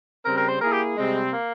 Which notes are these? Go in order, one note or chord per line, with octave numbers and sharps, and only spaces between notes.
C#3 G3 C4 A#4
A#4
C5
A#3 E4 G#4 A#4
G4
C3 G3 G#3 C4
A#3